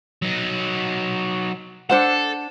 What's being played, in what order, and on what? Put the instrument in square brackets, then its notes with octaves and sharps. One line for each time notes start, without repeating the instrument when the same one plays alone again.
[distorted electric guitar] F#3 D#4
[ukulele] D4 C5 F#5 [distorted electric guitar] A4